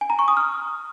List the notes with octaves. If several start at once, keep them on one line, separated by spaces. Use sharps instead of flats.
G#5
A#5
C#6
D#6
F6